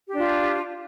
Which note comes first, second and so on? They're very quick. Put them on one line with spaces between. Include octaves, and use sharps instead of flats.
G4 D4 F4